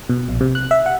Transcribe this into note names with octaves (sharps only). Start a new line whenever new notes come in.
B2
A#1
C3
F#6
E5
F#5